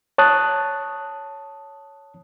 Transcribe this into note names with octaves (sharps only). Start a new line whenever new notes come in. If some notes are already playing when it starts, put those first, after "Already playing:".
C#5 A5 D#6 F#6